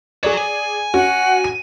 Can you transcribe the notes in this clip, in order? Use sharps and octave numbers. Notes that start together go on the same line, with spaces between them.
F#4 G#4 C#5 D5
G#5
C#4 F#4 F#5
D#7